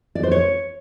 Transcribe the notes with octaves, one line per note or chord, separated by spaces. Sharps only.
D5
C5
C#5